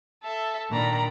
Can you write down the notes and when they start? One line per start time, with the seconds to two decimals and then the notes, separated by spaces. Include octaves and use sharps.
0.23 A4 E5
0.70 A#2 D#3 D4 D5 A#5 B5